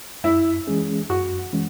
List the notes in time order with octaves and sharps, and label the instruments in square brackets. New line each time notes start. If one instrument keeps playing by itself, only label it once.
[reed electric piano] F#2 [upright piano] E4
[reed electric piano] E3 G#3 C#4 G#4
[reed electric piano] F#2 [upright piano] F#4
[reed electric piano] E3 G#3 C#4